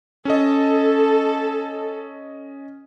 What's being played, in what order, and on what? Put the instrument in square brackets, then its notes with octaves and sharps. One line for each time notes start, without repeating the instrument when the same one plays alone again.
[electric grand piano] C#4 D#5 [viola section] A4